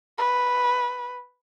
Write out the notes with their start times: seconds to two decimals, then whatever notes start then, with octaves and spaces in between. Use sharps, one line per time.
0.18 B4